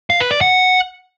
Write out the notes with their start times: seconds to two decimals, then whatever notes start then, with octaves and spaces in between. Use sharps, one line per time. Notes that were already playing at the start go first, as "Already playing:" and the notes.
0.10 F5
0.20 B4
0.31 D5
0.41 F#5